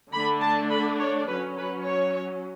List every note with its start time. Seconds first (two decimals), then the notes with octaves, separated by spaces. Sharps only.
0.12 D3 A3 D4 B5
0.41 A5
0.71 B5
0.98 C#5
1.28 F#3 C#4 B4
1.57 B4
1.85 C#5